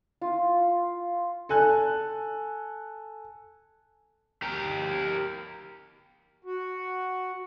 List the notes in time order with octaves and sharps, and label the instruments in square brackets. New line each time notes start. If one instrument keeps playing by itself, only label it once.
[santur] F4
[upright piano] A4 G#5 F#6
[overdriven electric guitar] G4 A#4
[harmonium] F#4